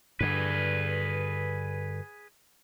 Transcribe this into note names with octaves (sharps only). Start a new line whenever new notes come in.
G2 D3 G#4 B4